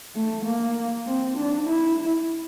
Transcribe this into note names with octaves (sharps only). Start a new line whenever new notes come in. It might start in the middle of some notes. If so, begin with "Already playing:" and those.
A3
A#3
C4
D4
E4